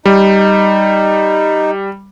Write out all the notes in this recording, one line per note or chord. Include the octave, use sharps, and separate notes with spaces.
G3 D#4